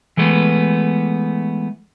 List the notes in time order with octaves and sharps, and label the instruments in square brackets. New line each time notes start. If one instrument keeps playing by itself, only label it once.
[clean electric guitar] E3 G#3 A3 B3